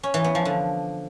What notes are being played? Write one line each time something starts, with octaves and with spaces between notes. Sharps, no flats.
C#4
E3
B3
F3
D3